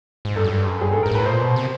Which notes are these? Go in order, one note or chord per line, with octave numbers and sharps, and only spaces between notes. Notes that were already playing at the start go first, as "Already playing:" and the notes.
G#2
G2 A4
F#2
G2
F#2
G2 G#4
G#2 A4
G#2 A#4
A2 B4
A#2 C5
B2
C3